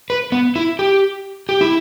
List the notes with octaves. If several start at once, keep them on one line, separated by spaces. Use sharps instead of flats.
B4
B3
E4
G4
G4
E4